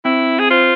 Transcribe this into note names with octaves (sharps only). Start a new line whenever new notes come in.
C4 E4
G#4
F4 C5